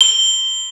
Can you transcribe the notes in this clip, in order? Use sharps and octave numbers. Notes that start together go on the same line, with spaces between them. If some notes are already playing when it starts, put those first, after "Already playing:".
G7